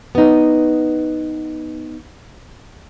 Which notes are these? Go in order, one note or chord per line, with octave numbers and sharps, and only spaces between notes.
B3 D#4